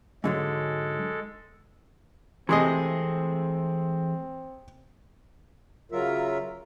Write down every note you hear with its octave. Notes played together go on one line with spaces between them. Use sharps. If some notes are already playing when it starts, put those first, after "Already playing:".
G#2 D3 F#3 G#3 A4
C3 E3 G#3 A3 C4 G#4 D#5
C#3 F#3 F4 A#4 E5